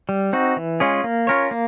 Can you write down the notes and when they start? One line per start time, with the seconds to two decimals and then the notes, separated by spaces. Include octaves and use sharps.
0.09 G3
0.33 C4 D#4 F#4
0.57 E3
0.80 G#3 C#4 F4 G#4
1.04 A#3
1.27 C#4 F4 A#4 C#5
1.51 A#3